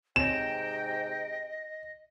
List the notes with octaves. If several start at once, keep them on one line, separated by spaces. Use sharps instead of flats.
G#2 C3 C4 C#5 D#5 G5 E7